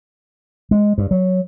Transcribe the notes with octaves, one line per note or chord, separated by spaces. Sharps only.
G#3
G2
F#3